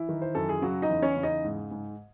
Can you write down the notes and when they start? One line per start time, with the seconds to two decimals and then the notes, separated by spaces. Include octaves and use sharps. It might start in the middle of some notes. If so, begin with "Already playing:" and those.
Already playing: E3 E4
0.09 D#3
0.22 C5
0.35 F#2 A4
0.49 G#4
0.62 C#3 F#3 F#4
0.82 D#4 D#5
0.89 E2
1.02 C#4 C#5
1.17 C#3
1.23 D#4 D#5
1.44 G#2
1.71 G#2